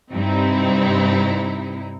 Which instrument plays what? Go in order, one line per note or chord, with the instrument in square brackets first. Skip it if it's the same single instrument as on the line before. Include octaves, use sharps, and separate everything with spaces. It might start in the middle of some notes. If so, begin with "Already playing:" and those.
[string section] G2 C3 C4 D#4 E4